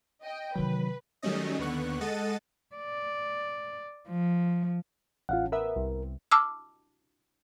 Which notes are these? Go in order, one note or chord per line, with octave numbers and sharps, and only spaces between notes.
D#5 G5
C3 D#3 E3 F#3 B4
D#3 F#3 G3 A3 C#4 D#5
D#2 D3 B3 C#6 F#6
G#3 A4 D#5 F#5 A6 D#7
D5
F3
A1 F4 F5 F#5
B3 A#4 E5
C2
A5 D6 E6 F6